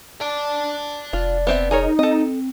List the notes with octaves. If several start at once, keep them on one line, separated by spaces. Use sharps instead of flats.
D5 A5
F1 F4
B3 C4 E5
D#4 G#4 A#4 C#5
C4 A4 D#5